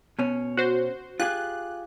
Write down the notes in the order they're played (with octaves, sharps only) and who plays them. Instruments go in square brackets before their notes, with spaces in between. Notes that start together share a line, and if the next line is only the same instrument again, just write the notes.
[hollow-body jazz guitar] B2 C#4
[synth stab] F#4 C5
[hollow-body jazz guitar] F4 G4 G#4 [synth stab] F#6